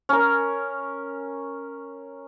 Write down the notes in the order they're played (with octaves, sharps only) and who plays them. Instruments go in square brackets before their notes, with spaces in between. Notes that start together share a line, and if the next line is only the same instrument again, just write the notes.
[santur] C#4 A#4